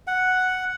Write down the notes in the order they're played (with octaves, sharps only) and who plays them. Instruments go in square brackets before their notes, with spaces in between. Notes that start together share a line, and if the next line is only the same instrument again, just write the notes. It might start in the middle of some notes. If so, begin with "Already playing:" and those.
[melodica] F#5